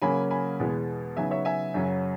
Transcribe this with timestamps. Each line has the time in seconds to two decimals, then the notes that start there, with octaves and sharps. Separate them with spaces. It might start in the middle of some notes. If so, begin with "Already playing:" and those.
0.02 C#3 F#3 A#3 C#4 G#5 B5
0.31 G#5 B5
0.59 E2 B2 G#3 B3
1.17 C#3 F#3 B3 D#4 E5 G#5
1.31 C#5 E5
1.45 E5 G#5
1.74 F#2 C#3 F#3 C#4